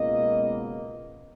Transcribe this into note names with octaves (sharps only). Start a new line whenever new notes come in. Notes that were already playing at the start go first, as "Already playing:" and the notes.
Already playing: C#2 B2 A#3 D#5